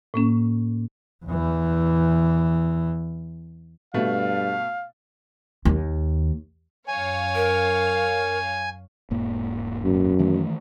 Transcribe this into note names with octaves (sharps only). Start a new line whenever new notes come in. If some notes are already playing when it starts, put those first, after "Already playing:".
A2 A#3 C#4
E2 E3
G2 B2 A3 F5
D#2
F#2 C#5 F5 G#5
A#4
E1 G#2 A#3
F#2
D#3 E3 A3